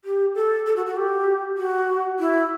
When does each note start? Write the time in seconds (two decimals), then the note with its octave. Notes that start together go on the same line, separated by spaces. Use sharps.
0.05 G4
0.35 A4
0.66 A4
0.76 F#4
0.86 F#4
0.97 G4
1.58 F#4
2.19 E4